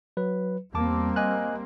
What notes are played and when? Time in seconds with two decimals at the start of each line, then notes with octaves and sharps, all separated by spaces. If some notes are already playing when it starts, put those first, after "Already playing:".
0.17 F#3 B4
0.74 E2 G3 A#3 C4 A5 D6
1.16 D#5 G#5 F#6